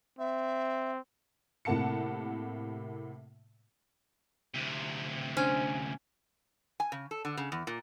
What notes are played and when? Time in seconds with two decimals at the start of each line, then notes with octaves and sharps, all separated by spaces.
0.19 C4 E5
1.65 A2 C3 A#3 F#5 A5 C#7
4.54 D2 C3
5.37 C#4 D4 C5
6.80 G#5
6.92 C#3
7.11 A4
7.25 D3
7.37 C#3
7.52 E2
7.67 A#2